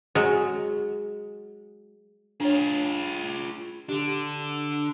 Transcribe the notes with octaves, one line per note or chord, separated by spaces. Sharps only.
F#3 G#3
D4 F4 G#4 C#5
D3 D4 G4